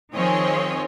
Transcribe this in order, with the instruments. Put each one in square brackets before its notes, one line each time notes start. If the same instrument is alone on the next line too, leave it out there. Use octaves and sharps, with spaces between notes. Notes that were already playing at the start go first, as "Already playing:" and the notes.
[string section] D#3 F3 C4 G#4 C#5 D#5